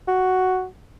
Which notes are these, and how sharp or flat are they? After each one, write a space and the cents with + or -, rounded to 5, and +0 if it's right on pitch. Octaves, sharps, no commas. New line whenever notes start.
F#4 +5